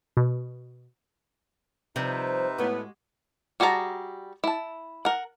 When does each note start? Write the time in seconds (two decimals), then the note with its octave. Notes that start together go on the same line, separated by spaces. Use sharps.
0.17 B2
1.96 C3 F3 G3 D#4 B4 E5
2.58 A2 G#3 B3 F#4
3.60 G3 F#4 G#4 A5 A#5
4.44 E4 A5
5.05 A#4 F#5